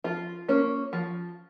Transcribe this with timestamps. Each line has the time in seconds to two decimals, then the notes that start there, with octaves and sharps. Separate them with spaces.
0.04 F3 F4
0.48 A#3 C#4
0.93 F3